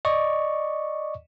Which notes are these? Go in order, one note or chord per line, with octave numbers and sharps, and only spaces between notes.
D5 D#5 C#6